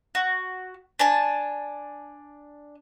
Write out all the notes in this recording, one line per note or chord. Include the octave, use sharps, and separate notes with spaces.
F#4
D4 G#5 A5